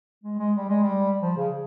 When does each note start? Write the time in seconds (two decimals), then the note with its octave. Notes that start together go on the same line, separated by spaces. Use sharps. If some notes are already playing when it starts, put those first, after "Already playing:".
0.24 G#3
0.39 G#3
0.56 G3
0.69 G#3
0.83 G3
1.21 F3
1.37 C#3